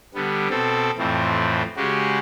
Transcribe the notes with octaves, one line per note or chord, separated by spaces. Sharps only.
D3 G3 B3
B2 C4 A4
F2 A2 E3 C4
C#3 G#3 F#4 G4